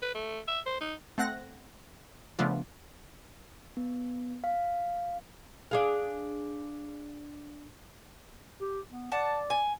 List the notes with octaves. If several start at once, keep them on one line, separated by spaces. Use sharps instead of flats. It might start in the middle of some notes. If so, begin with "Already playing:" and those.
B4
A3
E5
C5
D#4
A3 C4 F#5 F#6 A#6
C#3 F3 A3 B3 D4 F4
B3
F5
D4 G#4 F5
G4
B3
D5 F#5 A5
G#5